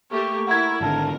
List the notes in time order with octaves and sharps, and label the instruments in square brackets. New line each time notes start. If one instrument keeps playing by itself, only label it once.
[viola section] A3 A#3 G4 [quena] C#6
[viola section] E4 A#4 [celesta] F#5 G#6
[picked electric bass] G#1 D3 [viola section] A#4 [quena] A5